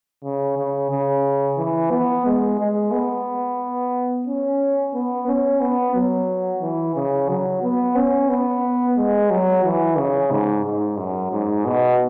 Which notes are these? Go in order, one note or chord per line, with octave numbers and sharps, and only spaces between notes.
C#3
C#3
C#3
E3
B3
G#3
G#3
B3
C#4
B3
C#4
B3
F#3
E3
C#3
F#3
B3
C#4
B3
G#3
F#3
E3
C#3
G#2
G#2
F#2
G#2
B2